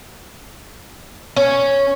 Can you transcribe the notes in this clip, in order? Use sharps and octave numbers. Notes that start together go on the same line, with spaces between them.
C#4